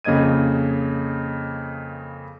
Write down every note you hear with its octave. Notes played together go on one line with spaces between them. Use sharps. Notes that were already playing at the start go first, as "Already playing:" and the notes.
F2 C#3 A#3 D#5 G#6 D#7